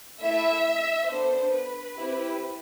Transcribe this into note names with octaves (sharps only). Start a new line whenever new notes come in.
A3 E4 A4 E5
B3 D4 A4 C5
B4
C4 E4 G4